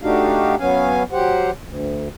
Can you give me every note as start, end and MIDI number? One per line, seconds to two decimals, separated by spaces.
0.01 0.55 57
0.01 0.55 62
0.01 0.55 63
0.01 0.55 66
0.01 0.55 67
0.01 0.55 77
0.59 1.03 54
0.59 1.03 59
0.59 1.03 61
0.59 1.03 77
0.59 1.03 80
1.12 1.50 54
1.12 1.50 67
1.12 1.50 72
1.12 1.50 78
1.62 2.08 38